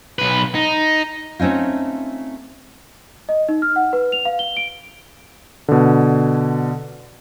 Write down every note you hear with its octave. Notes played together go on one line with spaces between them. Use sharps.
B1 B4
D#4
A3 C4 C#4 D#4 F4
D#5
D#4
F6
F#5
B4
F7
F5
G7
D7
B2 D3